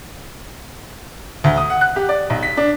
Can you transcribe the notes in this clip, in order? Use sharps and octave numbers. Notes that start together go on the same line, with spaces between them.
D2
D#6
F#5
F#6
G4
D5
B1
B6
D4